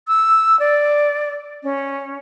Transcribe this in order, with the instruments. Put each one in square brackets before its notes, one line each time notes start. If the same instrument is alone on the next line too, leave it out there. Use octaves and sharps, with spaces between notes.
[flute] E6
D5
C#4